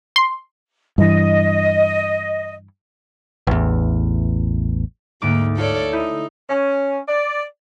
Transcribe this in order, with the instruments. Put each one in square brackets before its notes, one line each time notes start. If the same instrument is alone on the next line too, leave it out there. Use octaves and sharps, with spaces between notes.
[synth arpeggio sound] C6
[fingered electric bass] G2 E3 [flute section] D#5
[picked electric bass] A1 E2
[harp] D2 G#2 D6 [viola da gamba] A#3
[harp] A3 F4 [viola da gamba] A4 C#5 D5
[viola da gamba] D#4 [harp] E4 D#6 G6
[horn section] C#4
D5